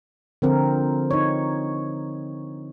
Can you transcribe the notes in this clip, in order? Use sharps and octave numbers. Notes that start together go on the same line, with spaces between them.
D3 F3 C4 A#4
D#4 C#5